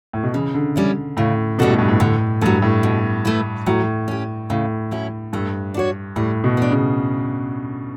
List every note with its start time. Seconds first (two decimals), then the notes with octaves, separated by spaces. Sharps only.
0.13 A2
0.23 B2
0.34 C#3 E3
0.54 D3
0.76 G3 C#4 E4
1.17 A2 C#3
1.59 B2 G3 C#4 F#4 A4
1.69 A2
1.79 G2
1.88 A2
2.00 A2 D3
2.41 G2 F#3 A3
2.62 A2
2.83 B2
3.25 A3 E4 B4
3.66 A2 F#3
4.08 C#4 G4
4.50 A2 C#3
4.91 F#3 C#4 E4
5.33 G2 A3
5.74 D4 F#4 C#5
6.16 A2 G3
6.44 B2
6.57 B3 D4
6.71 C#3